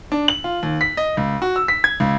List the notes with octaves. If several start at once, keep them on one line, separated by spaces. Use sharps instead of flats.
D4
F#7
F4
D#2
B6
D#5
C#2
F#4
E6
B6
G#6
C#2